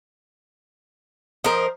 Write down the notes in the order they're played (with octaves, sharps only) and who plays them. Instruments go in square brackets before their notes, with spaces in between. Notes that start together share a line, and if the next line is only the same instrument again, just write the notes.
[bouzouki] F3 C5 [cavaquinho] A#4 D#5